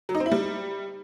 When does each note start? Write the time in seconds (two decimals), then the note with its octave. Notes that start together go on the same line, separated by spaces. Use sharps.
0.09 F#3
0.15 D#4
0.20 C4
0.26 E4
0.32 G3